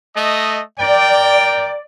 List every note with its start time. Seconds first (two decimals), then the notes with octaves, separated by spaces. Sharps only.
0.16 A3 D#5
0.80 A#4 D5 G5